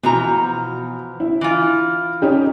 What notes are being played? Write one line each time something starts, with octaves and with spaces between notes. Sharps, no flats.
B2 E3 F3 A#5
E4
E3 F4
C#4 D#4 G4